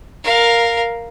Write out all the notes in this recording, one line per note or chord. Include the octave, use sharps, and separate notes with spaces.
A#4 F5